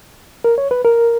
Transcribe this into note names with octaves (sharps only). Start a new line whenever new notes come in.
A#4
C#5
B4
A#4